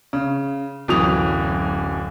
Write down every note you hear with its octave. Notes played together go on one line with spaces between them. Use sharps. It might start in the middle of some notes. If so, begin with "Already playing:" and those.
C#3
D1 F#2 E3 D#6 F7